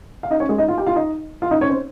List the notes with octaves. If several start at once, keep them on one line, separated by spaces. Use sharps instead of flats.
F5
D#4 D#5
C#4 C#5
G#3 G#4
D#4 D#5
F4 F5
G4 G5
F4 F5
D#4 D#5
F4 F5
D#4 D#5
C#4 C#5
C4 C5